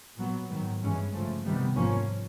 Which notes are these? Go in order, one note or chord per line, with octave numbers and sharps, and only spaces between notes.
A#2 F#3 B3
G#2 D#3 F#3 B3
G2 E3 G#3 C#4
C#3 F3 A3
C3 D#3 G3 B3
G#2 F3 A#3 C#4